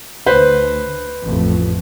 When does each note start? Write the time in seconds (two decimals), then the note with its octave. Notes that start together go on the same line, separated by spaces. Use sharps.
0.26 D2 B4 C5
1.23 A1 F2 A3